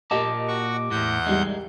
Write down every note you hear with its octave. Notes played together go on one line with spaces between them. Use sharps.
A#2 A#3 G4 A#4 D#5 A5 D6
F#4 C#6
E2 A2 F#5 G6
C2 G3 G#3 D#4